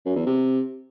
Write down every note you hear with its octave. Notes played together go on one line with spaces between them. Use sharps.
F#2
E2
C3